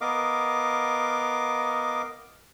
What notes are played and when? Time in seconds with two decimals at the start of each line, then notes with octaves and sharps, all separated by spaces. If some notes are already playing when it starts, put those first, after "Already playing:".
0.01 B3 A#4 D#5 F5 D6